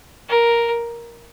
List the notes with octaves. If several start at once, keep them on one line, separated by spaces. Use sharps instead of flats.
A#4